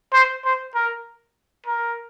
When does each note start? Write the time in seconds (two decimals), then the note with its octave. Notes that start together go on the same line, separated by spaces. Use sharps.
0.13 C5
0.45 C5
0.75 A#4
1.66 A#4